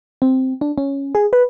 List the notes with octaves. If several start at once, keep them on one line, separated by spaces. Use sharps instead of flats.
C4
D4
C#4
G#4
B4